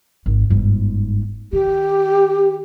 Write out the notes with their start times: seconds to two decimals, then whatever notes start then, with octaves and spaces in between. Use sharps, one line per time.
0.26 G#1
0.50 G1 G#2
1.53 D#3 G4